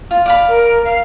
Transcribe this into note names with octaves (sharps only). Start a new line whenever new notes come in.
F4
D5 F5 B5
A#4
F5